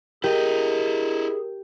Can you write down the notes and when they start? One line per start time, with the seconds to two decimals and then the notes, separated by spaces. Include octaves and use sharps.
0.24 E4 G4 G#4 A#4 D#5